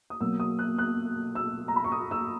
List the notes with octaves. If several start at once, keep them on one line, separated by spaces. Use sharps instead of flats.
D#6
B2 F#3 A#3 E6
D#6
F#6
F#6
E6
A#5
B5
C#6
D#6
E6